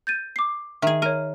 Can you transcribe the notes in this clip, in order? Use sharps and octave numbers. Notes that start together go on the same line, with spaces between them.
G6 A6 D#7
D6 C7
D#3 G#4 E5
A#4 C#5 D#7